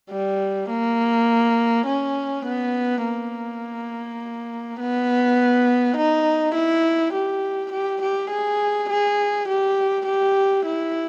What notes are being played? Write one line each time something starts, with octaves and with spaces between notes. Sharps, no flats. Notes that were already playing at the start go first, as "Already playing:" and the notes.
G3
A#3
C#4
B3
A#3
B3
D#4
E4
G4
G4
G4
G#4
G#4
G4
G4
E4